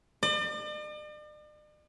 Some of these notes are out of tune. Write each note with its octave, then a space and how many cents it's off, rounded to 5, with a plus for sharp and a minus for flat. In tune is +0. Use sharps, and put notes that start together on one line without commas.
D5 +45